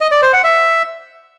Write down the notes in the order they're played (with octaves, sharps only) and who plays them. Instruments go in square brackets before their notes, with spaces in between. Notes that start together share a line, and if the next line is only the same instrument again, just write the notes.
[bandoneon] D#5
D5
C5
F#5
E5